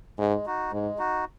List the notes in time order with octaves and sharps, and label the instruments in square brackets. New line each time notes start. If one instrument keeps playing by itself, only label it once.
[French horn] G#2 [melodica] G#3
[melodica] D#4 F#4
[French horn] G#2 [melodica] G#3
[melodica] D#4 F#4